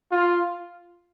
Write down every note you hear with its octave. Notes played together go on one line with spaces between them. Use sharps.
F4